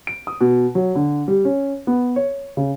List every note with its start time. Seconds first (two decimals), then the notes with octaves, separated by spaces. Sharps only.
0.07 D7
0.27 D#6
0.41 B2
0.75 F#3
0.95 D3
1.28 G3
1.45 C#4
1.87 B3
2.16 C#5
2.57 C#3